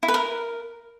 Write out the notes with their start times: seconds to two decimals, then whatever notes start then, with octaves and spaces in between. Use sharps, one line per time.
0.03 E4
0.08 B4
0.14 A#4